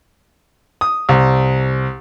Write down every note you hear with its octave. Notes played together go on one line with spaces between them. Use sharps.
D#6
C2